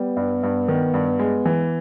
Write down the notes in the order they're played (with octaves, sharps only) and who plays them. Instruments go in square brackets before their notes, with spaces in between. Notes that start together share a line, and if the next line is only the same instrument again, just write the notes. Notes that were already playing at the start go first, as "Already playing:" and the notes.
Already playing: [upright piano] G3 [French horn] B3
[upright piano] G2
G2
D#3
G2
G#3
E3